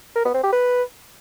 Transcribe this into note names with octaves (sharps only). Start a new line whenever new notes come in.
A#4
B3
C4
G4
B4